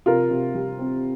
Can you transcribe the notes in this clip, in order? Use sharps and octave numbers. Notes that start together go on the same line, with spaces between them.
C3 F4 A#4
C3
G3
C4